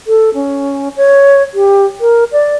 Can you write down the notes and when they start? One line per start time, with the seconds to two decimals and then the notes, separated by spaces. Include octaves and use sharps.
0.07 A4
0.34 C#4
0.96 C#5
1.54 G4
2.01 A#4
2.32 D5